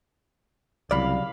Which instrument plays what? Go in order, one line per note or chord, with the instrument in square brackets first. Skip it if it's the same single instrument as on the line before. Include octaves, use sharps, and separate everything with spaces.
[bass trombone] C2 [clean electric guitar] C#3 F#3 D5 [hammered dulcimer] F5 B5